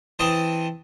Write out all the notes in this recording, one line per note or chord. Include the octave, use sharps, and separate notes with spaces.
E3 C4 D#5 A5 D#6